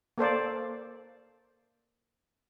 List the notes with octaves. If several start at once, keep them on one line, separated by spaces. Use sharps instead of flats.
A#3 A4 C5 D5